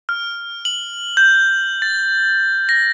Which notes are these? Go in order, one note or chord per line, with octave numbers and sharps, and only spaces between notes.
F6
F#7
G6
A6
A#6